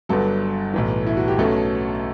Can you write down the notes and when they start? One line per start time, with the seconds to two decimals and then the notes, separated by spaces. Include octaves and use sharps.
0.09 G1 G2 F#3 A4
0.74 B1 A2 E3
1.07 E4
1.17 F#4
1.28 G4
1.38 B1 B2 A3 C#4 A4